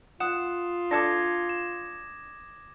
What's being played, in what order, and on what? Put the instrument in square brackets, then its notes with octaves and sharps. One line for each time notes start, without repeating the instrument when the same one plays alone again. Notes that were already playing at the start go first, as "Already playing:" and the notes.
[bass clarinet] F4 [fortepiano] F#5 [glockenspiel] D#6 E7
[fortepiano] D4 A4 A5 [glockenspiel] D6 G#6 A#6
[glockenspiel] E7